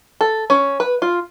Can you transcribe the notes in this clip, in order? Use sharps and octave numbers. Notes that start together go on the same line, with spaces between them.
A4
C#4
B4
F4